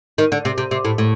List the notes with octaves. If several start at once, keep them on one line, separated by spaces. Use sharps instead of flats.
D#3
D3
C3
C3
C3
A2
A2